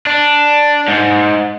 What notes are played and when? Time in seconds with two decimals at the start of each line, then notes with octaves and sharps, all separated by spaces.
0.07 D4
0.88 G#2